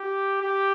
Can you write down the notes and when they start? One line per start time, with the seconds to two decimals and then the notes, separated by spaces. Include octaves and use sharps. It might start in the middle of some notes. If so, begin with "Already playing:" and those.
Already playing: G4
0.41 G4